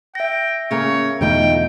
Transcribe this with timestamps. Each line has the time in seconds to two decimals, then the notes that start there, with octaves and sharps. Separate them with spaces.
0.15 E5 G5 A#6
0.71 C#3 A#3 A#4 C#5
1.21 E2 B2 D3 A3 D#4 F4 G5